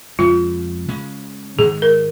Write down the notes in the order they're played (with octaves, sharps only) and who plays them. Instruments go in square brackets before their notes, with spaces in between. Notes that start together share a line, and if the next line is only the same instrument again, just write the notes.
[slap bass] F2 C#3 G#3 [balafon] F4
[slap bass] C#3 G#3 C#4
[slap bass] G#2 D#3 G#3 [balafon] G#4
[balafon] A#4